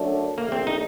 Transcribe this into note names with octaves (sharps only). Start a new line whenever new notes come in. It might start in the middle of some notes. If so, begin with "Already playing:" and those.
Already playing: F#2 F#3 A3 D4
A#1 A2 A3 A#3
C4
D#4